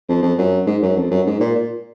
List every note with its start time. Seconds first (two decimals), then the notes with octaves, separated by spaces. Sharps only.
0.09 F2
0.23 F2
0.38 F#2
0.66 G#2
0.82 F#2
0.96 F2
1.10 F#2
1.26 G#2
1.40 A#2
1.55 A#2